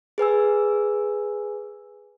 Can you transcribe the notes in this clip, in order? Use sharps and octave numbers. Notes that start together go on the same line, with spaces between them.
G#4 B4 G#5 E6